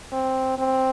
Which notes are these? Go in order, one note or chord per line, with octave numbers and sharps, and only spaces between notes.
C4
C4